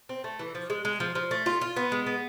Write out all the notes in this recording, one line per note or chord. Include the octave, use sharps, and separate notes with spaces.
C4
A3
E3
F3
G#3
G#3
F3
F3
A3
F4
F4
B3
G#3
B3